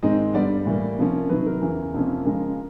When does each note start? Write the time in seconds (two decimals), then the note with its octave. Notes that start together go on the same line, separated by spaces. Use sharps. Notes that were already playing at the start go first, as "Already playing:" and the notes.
0.03 G#2 D#3 G#3 C4 D#5
0.34 G2 D3 G3 B3 D5
0.66 A2 E3 G3 A#3
0.99 C3 F3 A#3 C#4
1.29 C3 D#3 F#3 B4
1.46 A#4
1.61 E2 C#3 E3
1.94 F2 C3 F3 A#3 C#4
2.25 C#3 F3 G#3 A#4